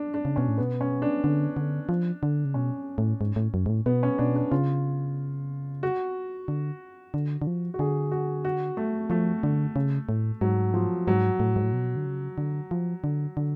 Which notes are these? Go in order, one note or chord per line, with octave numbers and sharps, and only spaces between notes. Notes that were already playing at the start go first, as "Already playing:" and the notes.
Already playing: D4
D4
C#3
B2 C#4
A2
B2 B3
C#4
D4
D3
D3
F3
D3
C#3
B2 C#4
A2
G#2
A2
F#2
G#2
A2
B2 B3
C#4
B2 D4
D4
C#3 F4
F#4
D3
D3
D3
F3
F#4
D3 G#4
F#4
F#4
A3
F3 A3
D3
C#3
A2
G#2 F#3
F3
G#2 F#3
A2
G#2
A2
B2
D3
C#3
D3
F3
D3
D3